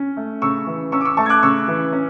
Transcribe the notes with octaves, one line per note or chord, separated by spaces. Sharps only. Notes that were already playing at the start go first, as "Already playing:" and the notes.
Already playing: C#4
A3
C#3 C#6 E6
E3
C#4 C#6 E6
D6
C#6 E6
A3 A5 C#6
G#6
D6 F#6
C#3 C#6 E6
E3
C#4